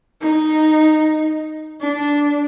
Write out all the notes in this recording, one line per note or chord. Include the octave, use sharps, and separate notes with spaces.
D#4
D4